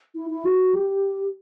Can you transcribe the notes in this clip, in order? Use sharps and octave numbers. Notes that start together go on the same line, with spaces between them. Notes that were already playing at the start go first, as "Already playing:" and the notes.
E4
E4
F#4
G4